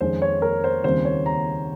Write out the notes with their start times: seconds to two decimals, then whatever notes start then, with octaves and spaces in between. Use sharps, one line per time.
0.01 F2 D#3 G#3 C#4 C5
0.22 C#5
0.42 A#4
0.64 C5
0.84 D#2 C#3 G3 C4 C5
1.05 C#5
1.26 A#5